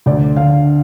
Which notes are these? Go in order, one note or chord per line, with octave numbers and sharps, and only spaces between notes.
D2 D5
D3 F5